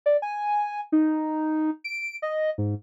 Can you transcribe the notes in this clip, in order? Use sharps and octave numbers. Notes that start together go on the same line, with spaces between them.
D5
G#5
D#4
D7
D#5
G#2